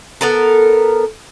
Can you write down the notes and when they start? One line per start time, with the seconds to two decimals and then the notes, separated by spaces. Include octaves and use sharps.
0.21 B3 A4 A#4